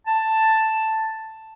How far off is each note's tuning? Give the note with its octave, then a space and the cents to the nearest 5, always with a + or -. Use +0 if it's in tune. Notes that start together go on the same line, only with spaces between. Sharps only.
A5 +5